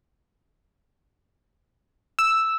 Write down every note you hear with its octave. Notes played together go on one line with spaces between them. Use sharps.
E6